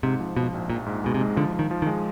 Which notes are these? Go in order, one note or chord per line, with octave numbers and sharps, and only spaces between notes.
G#2 C3
F3
B2 F3
A#1
A#1 A#2
G#2
B2 G#3
C3
G#2
D3 F3
F3
D#3
F3
D#3
G#3